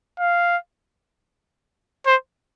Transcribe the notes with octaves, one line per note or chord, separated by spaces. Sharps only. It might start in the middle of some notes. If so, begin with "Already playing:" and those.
F5
C5